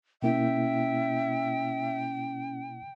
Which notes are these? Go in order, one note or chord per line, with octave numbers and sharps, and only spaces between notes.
B2 A#3 C#4 E4 E5 G5